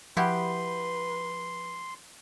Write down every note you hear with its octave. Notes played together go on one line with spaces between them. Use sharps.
F3 E4 F#4 G4 B4 C6 G6